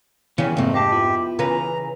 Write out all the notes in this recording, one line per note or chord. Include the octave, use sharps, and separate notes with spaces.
G2 C#3 E3 B3
F2 G#2 C3 A3 A#3 C4
G4 D#5 F5 A5
B3 E4 F4
C#3 E3 B4 A#5